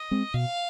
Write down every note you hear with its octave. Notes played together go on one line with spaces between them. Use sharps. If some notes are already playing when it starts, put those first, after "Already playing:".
Already playing: D#5
G#3 C4
B2 F5